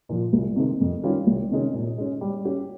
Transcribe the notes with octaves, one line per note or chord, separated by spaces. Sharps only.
A#2 F3
C2
C3 D#3 G#3 C4
F2
D#3 G3 C#4 F4
C2
C3 D#3 G#3 C#4
A#2
G#3 C#4
G3
C#4 G4